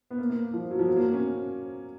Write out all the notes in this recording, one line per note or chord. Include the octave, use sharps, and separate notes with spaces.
B3
A#3
A#3
F3
F#3
F3
F#3
A#3
C#4